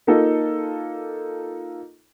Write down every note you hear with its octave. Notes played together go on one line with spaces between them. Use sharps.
A#3 D#4 F4 A4